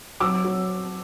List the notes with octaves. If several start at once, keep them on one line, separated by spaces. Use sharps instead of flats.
F#3 D6 E6
F#3